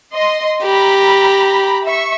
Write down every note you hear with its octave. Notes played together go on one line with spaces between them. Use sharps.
D#5 C6
G4 A#5 B5
E5 C#6